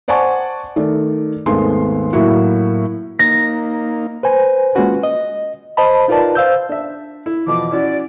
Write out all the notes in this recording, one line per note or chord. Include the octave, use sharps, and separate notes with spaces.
C5 D5 F#5 G#5 A5 C#6
D#3 A3 D5
G#1 D#2 G#3 A3 B3 C6
A2 F#3 A#3 E4 F#4
A#3 D#4 A#6
B4 C5 G#5
G#3 A#3 C#4 F4 F#4 B4
D#5
C5 D#5 A5 B5
D#4 F4 A#4 B4 D5 A5
C5 F5 E6 G6
D4 E5
E4
E2 B2 F3 D6
C#4 E4 F#4 D5